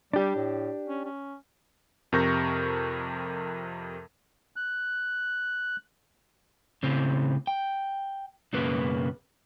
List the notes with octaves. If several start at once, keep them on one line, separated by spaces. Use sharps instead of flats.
G3 D4 G4
A2
C#4
C#4
F2 C3 A#4 C#6 G6 A#6
F#6
A2 C#3 C4
G5
B1 F#2 C#3 A#3 B4